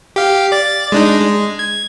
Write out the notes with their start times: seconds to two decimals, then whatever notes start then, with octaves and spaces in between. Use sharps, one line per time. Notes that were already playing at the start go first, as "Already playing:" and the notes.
0.16 G4 F5
0.52 D5 A6
0.92 G#3 D4 D#4
1.21 G#3
1.59 G#6